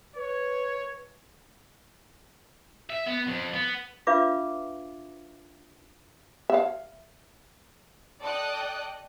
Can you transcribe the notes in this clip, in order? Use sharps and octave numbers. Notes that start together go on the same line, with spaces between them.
B4 C#5
E5
B3
F2
B3
D4 F4 B4 E5 F5 D6
E5 F5
A4 D5 D#5 G5 D#6 F#6